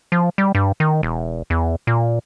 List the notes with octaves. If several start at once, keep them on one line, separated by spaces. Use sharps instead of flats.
F3
G3
G2
D#3
E1
E2
A#2